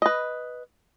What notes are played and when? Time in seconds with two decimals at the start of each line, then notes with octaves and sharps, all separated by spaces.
0.02 B4 D#5